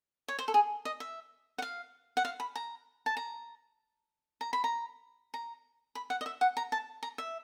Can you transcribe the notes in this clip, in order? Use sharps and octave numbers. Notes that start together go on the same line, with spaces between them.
C#5
C5
A4
G#4
D#5
E5
F#5
F5
F#5
F5
B5
A#5
A5
A#5
A#5
B5
A#5
A#5
B5
F#5
D#5
E5
F#5
A#5
A5
A#5
E5